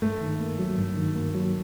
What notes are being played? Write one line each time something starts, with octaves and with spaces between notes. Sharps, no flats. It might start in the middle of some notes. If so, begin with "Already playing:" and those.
G2 A3
D#3
A#3
F#3
G2
D#3
A#3
F#3